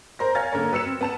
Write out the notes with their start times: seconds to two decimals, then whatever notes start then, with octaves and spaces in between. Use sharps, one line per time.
0.19 A#4 C5 A#6
0.35 C#5 F5 G#5 F6 G#6 A6
0.52 D3 A#3 A#4 C#5
0.72 F#3 B4 E6 C#7 E7
0.86 C4
1.01 B3 A5 E7